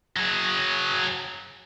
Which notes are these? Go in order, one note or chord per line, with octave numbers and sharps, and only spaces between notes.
F#3 G#4